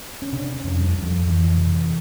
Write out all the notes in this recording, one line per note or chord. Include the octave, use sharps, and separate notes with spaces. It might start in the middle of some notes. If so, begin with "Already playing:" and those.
C#4
C3 D4
C#4
F2
G3
F2
F3
F2 E3
C3